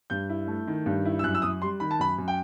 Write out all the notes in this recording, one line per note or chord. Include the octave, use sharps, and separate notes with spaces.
G2 G6
E4
A3
D#3
G2
E4
E6
F#2 F#6
E6
F#2 D#6
G3 C6
D#3 B5
A5
F#2 B5
F#2
G5